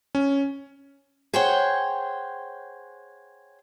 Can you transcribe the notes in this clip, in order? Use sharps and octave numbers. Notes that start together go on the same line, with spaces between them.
C#4
G#4 C5 C#5 F#5 G5